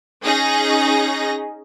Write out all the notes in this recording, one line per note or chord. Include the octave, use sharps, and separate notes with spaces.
C#4 D#4 G#4 D#5 A#6